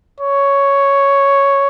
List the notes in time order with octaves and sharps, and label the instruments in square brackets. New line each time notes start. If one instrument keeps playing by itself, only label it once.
[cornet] C#5